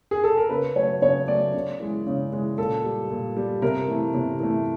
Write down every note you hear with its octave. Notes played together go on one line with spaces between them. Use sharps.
G#4
A4
A#4
C#3 B4
F#3 A3 C#5
C#3 C#5
F#3 A3 D5
C#3
E3 G#3
C#3
E3 G#3
A#2 A4
G3
A#2
G3
C3 A#4
E3 A3
C3
E3 A3